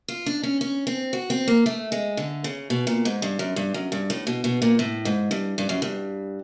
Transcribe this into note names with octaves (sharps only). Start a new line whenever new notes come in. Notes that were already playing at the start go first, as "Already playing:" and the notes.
F4
D4
C#4
C#4
C4
F#4
C4
A#3
A3
G#3
D3
C#3
B2
A#2
G#2
G2
F#2
G2
F#2
G2
A2
B2
B2
A#2
A2
G#2
G2
G2
F#2
G2